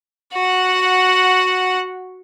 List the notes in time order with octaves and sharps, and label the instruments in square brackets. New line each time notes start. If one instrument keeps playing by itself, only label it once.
[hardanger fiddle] F#4 F#5